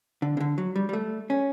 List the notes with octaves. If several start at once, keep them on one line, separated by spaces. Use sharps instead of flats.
D3
C#3
D3
F#3
G3
G3
A3
C#4